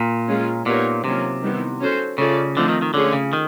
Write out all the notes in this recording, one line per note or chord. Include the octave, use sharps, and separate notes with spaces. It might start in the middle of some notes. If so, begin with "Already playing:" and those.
Already playing: A#2
G#3 C#4 F4 G#4
A#2 B3 D#4 G4 A#4 C#5
C3 D#3 F#3 A#3 C#4 F4
D#3 G3 B3 E4
C#4 F#4 A4 C5
C#3 A3 C#4 F4 A4 D5
D3 F3 A3 C4 D#4
D#3
D#3
D3 A3 C#4 F4 G#4 C#5
C#3
D#3